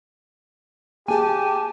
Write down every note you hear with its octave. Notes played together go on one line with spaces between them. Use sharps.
A#3 G4 G#4 G#5 A5